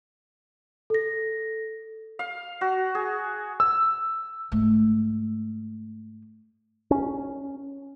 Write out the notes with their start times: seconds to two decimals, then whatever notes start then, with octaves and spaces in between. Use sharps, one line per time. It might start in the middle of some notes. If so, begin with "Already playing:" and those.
0.90 A4 A#6
2.19 F5
2.61 F#4
2.95 G#4
3.60 E6
4.52 G#2 A3
6.91 C#4